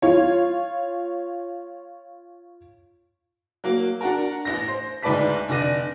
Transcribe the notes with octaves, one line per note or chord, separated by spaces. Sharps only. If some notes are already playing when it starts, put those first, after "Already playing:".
F4 C#5
F#3 A#3
D4 F#4 A#4
A1 A#6
C5
D2 G#2 B4 D5 A5 B6
F1 D3 D5 A#6 D#7